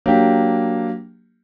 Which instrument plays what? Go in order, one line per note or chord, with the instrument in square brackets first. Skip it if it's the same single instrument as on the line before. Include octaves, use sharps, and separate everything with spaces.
[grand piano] F#3 A#3 D4 G4